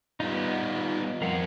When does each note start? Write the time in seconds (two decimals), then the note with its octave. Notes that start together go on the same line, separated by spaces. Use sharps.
0.20 G3 B3 D#4 F4
1.22 F2 C4 A#4 F5 F#5